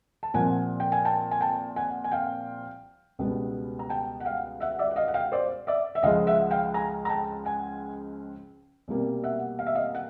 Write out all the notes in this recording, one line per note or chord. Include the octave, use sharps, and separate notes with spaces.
A5
C2 A#2 F3 F#5 G#5
G5
G#5
G5 A5
G#5
G5 A5
F#5 G#5
G#5
F5 G5
C#2 B2 G3 B3
A#5
G5 A5
F#5
F5 G5
E5 F#5
D5 E5
F#5
D#5 F5
F#5
F5 G5
C5 D5
D5 E5
E5
C#2 C#3 F3 G#3 D#5 F5
E5 F#5
F5 G5
G#5 A#5
A#5
G5 A5
F#5 G#5
C2 B2 G3 A#3
E5 F#5
F5
E5
D#5 F5
F#5